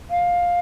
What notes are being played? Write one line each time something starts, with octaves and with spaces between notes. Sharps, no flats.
F5